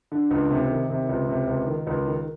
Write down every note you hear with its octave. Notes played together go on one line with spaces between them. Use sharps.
D3
C#2
C3
D#3
C3
C#2
C3
C#2
D#3
C#2
D#3